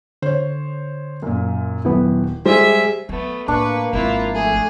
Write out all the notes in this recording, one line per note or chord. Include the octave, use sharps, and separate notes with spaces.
D3 C5 C#5
F#2 A#2
D#1 F#3 B3 E4
G3 G#3 G#4 C5 E5
F#3 A3 B3
A2 A#3 D4 B4 C#6
G#1 F3 E4 F4
A3 G#4